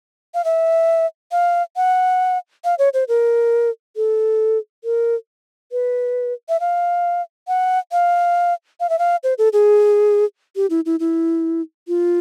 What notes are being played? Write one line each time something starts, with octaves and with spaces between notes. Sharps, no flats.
F5
E5
F5
F#5
F5
C#5
C5
A#4
A4
A#4
B4
E5
F5
F#5
F5
F5
E5
F5
C5
A4
G#4
G4
E4
E4
E4
F4